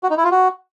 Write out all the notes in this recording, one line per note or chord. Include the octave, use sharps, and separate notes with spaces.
F#4
D#4
E4
F4
F#4